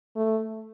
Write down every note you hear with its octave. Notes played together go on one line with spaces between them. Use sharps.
A3